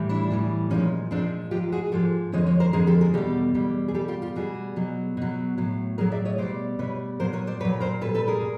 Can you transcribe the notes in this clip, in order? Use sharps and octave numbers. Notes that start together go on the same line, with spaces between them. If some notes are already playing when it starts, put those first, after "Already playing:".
Already playing: A2 E3 G3
D4 E4
A2 E3 G3
A#2 F3 G#3 C#4 D#4
A#2 F3 G#3 C4 D4
G#2 F3 G#3 F4 G4
F#4 G#4
G#2 F3 G#3 G4 A4
F2 D3 F3 G#3 C#5 D#5
C#5 D#5
A#4 C5
F2 D3 F3 G#3 G#4 A#4
G4 A4
G#4 A#4
E2 B2 G3 G4 A4
E2 B2 G3
G#4
B2 G3 G4 A4
F4 G4
F4 G4
B2 G3 F#4 G#4
B2 F#3
B2 F#3
A2 F#3
A2 F#3 G#4 A#4
D5 E5
C#5 D#5
B2 G3 C5 D5
B2 G3 B4 C#5
A#2 F#3 A#4 C5
B4 C#5
C5 D5
A#2 F#3 B4 C#5
A#4 C5
A#2 G3 A4 B4
A4 B4
G#4 A#4
A#2